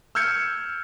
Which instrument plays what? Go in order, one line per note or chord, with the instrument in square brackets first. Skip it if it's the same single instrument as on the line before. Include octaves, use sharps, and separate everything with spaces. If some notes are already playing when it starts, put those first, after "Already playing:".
[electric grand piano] E6 F6 G6 G#6 C#7